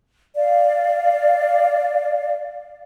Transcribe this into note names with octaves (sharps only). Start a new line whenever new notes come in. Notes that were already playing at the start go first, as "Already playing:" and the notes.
D5 F5